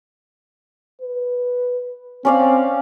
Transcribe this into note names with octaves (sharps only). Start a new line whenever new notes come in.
B4
C4 C#4 D5 F5